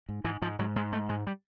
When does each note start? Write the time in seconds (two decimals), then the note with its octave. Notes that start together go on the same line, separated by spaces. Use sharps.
0.09 G#2
0.24 G#2 E3
0.42 G#2 F3
0.59 G#2 F#3
0.76 G#2 G#3
0.92 G#2 A3
1.09 G#2 G#3
1.27 G3